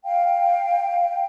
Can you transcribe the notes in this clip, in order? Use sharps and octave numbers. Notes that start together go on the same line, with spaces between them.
F5 G5